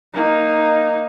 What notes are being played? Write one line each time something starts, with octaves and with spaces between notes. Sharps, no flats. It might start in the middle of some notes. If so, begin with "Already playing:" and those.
A#3 D#4